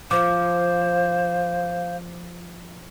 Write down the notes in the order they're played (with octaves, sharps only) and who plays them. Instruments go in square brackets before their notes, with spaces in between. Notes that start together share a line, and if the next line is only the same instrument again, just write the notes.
[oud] F3 [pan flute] C5 [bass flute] F5 [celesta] D6